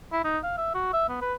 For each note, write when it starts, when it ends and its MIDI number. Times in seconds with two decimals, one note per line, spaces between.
0.12 0.22 64
0.24 0.38 63
0.43 0.57 77
0.58 0.74 76
0.75 0.92 66
0.93 1.09 76
1.09 1.20 59
1.21 1.34 71